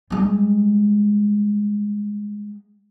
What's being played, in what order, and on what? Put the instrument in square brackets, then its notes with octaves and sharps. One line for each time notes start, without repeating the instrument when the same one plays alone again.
[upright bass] G3 G#3